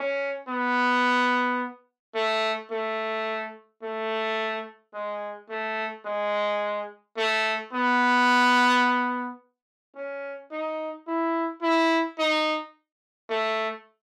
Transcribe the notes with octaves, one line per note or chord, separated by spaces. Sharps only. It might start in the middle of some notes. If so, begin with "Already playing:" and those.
Already playing: C#4
B3
A3
A3
A3
G#3
A3
G#3
A3
B3
C#4
D#4
E4
E4
D#4
A3